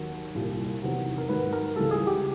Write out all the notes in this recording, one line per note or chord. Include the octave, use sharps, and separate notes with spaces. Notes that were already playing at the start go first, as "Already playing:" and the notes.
Already playing: D#2 D#3 F#3
C2 A#2 G3
E2 C3 D#3 F#3
A#4
G#2 D#3 F#3 B4
A#4
C#2 C#3 E3 G3 A4
G#4
G4